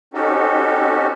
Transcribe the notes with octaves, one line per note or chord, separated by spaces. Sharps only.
C4 C#4 D#4 F#4 G4 A4